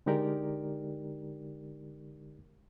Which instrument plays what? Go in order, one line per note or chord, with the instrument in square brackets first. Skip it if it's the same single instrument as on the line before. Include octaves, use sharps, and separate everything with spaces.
[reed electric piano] D3 G#3 D#4 G4 A#4 D5